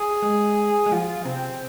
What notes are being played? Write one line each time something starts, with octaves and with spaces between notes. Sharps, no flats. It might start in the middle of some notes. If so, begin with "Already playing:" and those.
Already playing: G#4
G#3
G#3
F3 F4
C3 C4